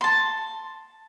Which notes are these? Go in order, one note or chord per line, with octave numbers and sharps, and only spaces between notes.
A5 C6